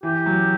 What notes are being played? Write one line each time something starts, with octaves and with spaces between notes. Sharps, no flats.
E3 G4
F#3